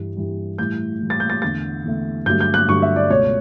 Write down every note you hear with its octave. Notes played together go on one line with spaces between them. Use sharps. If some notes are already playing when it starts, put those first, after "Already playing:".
Already playing: G2 E3 G3
G2 E3 G3
A2 E3 G3 G6
A2 E3 G3
A6
G6
A6
E2 D3 A3 A6
E2 D3 A3
G2 D3 F#3 A3 G6
G6
F#6
G2 D3 F#3 A3 C#6
E5
D5
C#2 B2 A3 C#5